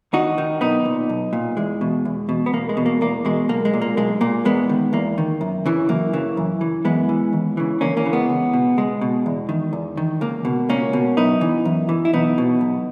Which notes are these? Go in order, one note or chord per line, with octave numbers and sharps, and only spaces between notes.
D#2 D#4 F#4
D#3
B1 B3 D#4
A#2
B1
A#2
E2 G#3
B2
E2
B2
B3
E2 A#3
G#3
B2
A#3
E2 A#3
B2 G#3
B1 A#3
G#3
A#2
A#3
B1 G#3
A#2 A#3
E2 G#3 B3
D#3
E2 A#3
D#3
F#2
C#3 E3
F#2 A#3
C#3 E3
F#2
E3
F#2 G#3 B3
E3
D#2
C#3 E3
D#2 A#3 C#4
A#3 C#4
C#3 E3
G#3 B3
C#2
B2
C#2 G#3
B2
E2
D#3
E2
D#3
C#2 A#3
B2
C#2 A#3 C#4
B2
F#2 B3 D#4
E3
F#2
E3
E4
B1 B3 D#4
B2
B1